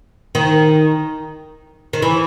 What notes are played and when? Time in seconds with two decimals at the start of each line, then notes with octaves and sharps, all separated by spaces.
0.35 D#3
1.93 D#3
2.02 E3